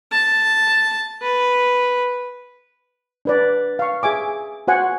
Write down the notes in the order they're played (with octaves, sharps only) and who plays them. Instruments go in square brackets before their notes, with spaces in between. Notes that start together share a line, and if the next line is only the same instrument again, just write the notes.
[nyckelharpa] A5
B4
[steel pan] D4 B4 D5
F5 C#6
G#4 E5 G#5 D6
F#4 C5 F#5 G#5